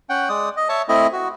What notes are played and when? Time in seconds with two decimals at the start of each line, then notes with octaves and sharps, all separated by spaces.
0.09 C#4 F#5 G5
0.29 G#3 D5 D#6
0.57 D#5
0.69 C#5 E5 A5
0.89 A3 C4 E4 D#5
1.13 F#4